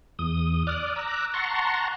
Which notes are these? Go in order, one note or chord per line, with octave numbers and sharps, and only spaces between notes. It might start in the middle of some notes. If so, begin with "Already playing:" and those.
E2 D#6
D5 D6 D#6 F6 F#6
A#5 D6 E6 F#6
F#5 A5 A#5 C6 C#6